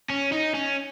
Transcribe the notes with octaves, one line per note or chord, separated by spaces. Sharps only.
C#4
D#4
C#4